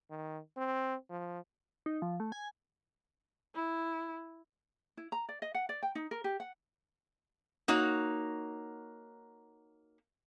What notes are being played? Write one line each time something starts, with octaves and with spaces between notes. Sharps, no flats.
D#3
C4
F3
D#4
F3
A3
G#5
E4
E4
A#5
D5
D#5
F#5
D5
G5
D#4
A#4
G4
F#5
A#3 D#4 F#4 C#5